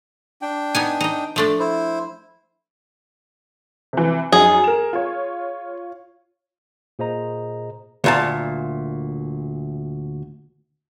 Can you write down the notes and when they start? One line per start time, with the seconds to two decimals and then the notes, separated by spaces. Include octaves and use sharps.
0.42 D4 G5
0.75 B3 D#4 G#5
1.01 D#4 D#5
1.36 F3 A3 D4
1.59 E4 C5
3.93 C3 E3
4.32 F#2 D#4 G#4
4.64 A#4 G#5 E7
4.93 F4 C#5
6.99 A#2 G#4 C5 D#5 A#5
8.04 D2 A#2 A5